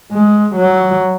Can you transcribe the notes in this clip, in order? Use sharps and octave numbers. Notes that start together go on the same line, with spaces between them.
G#3
F#3